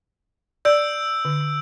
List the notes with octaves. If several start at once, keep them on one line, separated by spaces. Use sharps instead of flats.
D5 E6 G6 D7
D3